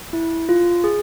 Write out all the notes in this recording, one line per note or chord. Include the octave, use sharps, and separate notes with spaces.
E4
F4
G#4